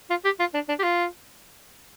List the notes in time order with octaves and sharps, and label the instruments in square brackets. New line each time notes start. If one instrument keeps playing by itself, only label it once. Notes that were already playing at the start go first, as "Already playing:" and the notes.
[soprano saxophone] F4
G4
F4
D4
D4
G4
F4